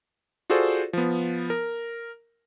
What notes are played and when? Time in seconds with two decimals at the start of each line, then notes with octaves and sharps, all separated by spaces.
0.50 F4 F#4 G#4 A4 C5 D5
0.93 F3 B3
1.50 A#4